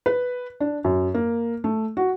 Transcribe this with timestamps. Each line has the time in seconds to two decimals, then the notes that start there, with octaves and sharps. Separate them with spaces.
0.06 B4
0.60 D4
0.84 F#2
1.14 A#3
1.64 A3
1.97 F#4